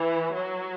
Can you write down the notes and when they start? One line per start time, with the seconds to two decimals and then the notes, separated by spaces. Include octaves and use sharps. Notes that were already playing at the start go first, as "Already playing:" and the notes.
Already playing: E3
0.33 F#3